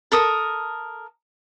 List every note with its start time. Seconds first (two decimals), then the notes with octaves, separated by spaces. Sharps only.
0.12 A4 A#4 D#6